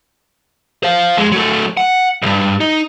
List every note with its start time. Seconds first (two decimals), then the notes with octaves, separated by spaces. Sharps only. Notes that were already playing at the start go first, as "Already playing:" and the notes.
0.83 C5 F5
1.17 F2 G#3
1.32 F#3 A3
1.77 F#5
2.22 B1 G2
2.61 D#4